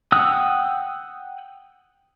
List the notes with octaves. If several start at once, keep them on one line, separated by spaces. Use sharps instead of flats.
F#5 G5 D#6 E6 F#6